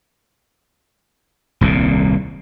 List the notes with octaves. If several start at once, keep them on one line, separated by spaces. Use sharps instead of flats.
D#1 C2 A#2